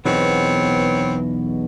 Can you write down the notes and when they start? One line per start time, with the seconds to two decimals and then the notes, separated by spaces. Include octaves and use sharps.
0.06 B1 E2 B2 B3 C4 C#5